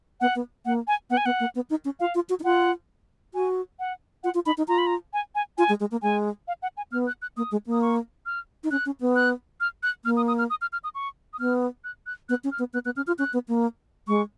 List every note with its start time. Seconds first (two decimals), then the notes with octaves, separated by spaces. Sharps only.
0.21 B3 F#5
0.35 B3
0.66 A#3 F#5
0.87 G#5
1.10 B3 F#5
1.17 G#5
1.25 B3 F#5
1.40 A#3
1.55 B3
1.70 D#4
1.85 C#4
2.00 F4 F5
2.15 F4
2.29 F#4
2.40 D#4
2.44 F4 F#5
3.34 F#4 G#5
3.79 F#5
4.24 F4 F#5
4.34 F4
4.46 D#4 B5
4.58 D#4
4.68 F4 A#5
4.78 B5
4.87 A#5
5.13 G#5
5.35 G#5
5.58 F4 G#5
5.69 G#3
5.80 G#3
5.91 A#3
6.02 G#3 G#5
6.48 F5
6.62 F#5
6.77 G#5
6.92 B3 F6
7.07 F#6
7.22 F#6
7.37 A#3 D#6
7.52 G#3
7.67 A#3
7.72 D#6
7.82 C#6
8.26 F6
8.64 D#4
8.71 C#4 F#6
8.86 C#4
9.01 B3
9.16 F#6
9.61 F6
9.83 F#6
10.05 A#3 F6
10.17 D#6
10.28 D#6
10.39 F6
10.50 D#6
10.61 F6
10.73 F6
10.84 D#6
10.95 C#6
11.33 D#6
11.40 B3 F6
11.84 F#6
12.06 F#6
12.29 B3 F#6
12.44 C#4
12.52 F6
12.59 B3
12.73 B3 F#6
12.85 B3 F#6
12.96 C#4 F6
13.07 F4 F6
13.18 C#4 F#6
13.33 B3
13.48 A#3
14.08 G#3 C#6